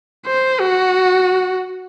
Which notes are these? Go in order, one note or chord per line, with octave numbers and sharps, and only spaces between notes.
C5
F#4